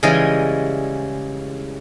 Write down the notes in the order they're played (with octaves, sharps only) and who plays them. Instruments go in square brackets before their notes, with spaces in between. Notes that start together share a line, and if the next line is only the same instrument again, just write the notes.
[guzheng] C#3 E3 G3 G#3 D#5 G#5